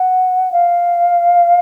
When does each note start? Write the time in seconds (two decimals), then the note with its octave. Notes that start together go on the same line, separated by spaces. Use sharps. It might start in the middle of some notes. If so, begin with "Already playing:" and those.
Already playing: F#5
0.52 F5